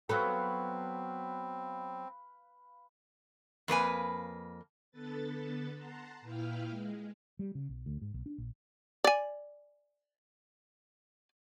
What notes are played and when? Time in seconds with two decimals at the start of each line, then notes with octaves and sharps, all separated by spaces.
0.09 F#3 B3 C4 A4 B4 F5
3.68 F2 A#3 B4 G#5
4.91 D3 B3 A4 B4 A6
5.75 F#5 A5 A#5 C6
6.21 A#2 E4 B4 F5 G5 F6
6.70 G#3
7.39 G3
7.55 C#3
7.69 B1
7.86 D2
8.02 G#2
8.14 B1
8.26 D4
8.38 A#1
9.04 D5 G#5